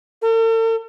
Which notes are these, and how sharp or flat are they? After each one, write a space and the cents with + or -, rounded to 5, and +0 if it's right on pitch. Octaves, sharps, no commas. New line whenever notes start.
A4 +45